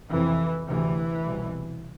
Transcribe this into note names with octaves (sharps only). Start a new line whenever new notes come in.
F2 C3 E3
D2 C3 E3
C2 B2